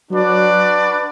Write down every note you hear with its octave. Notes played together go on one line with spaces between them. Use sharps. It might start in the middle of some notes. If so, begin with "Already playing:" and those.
F#3 D4 F#4 B4 D5